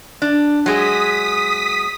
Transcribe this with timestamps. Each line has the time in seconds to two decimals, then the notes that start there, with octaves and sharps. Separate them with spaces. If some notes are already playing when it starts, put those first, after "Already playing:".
0.22 D4
0.66 F#3 G#3 G#4 D#6 B6